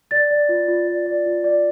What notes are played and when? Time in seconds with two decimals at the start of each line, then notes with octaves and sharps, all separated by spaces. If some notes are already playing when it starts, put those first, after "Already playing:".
0.11 D5 A6
0.31 D5
0.49 F4
0.68 F4
0.87 D5
1.06 D5
1.26 F4
1.44 D5